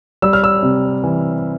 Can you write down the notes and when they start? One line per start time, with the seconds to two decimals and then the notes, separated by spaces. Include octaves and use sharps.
0.22 G3 E6
0.33 F6
0.44 E6
0.63 C3
1.03 E3